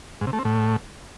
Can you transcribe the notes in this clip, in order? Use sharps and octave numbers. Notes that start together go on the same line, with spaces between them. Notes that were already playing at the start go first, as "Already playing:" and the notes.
G#2
C3
A3
C4
A2